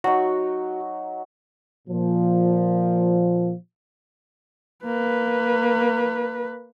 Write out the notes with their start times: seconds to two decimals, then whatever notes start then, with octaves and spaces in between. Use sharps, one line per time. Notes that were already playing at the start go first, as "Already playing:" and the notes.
0.04 F#3 D#4 F#4
1.88 A#2 F3
4.85 A#3 B4